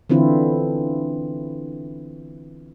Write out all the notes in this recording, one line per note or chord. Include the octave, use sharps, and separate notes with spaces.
D3 E3 C4 E4 F4